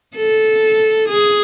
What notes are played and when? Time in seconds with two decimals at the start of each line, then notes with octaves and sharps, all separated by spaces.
0.16 A4
1.09 G#4